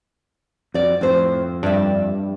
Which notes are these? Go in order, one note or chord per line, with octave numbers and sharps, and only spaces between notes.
F2 F#4 D5
F2 A2 C5
G2 D5 E5